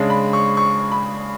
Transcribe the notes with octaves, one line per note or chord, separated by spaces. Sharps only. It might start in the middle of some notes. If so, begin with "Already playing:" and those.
Already playing: C#3 G#3 D4
B5
C#6
C#6
B5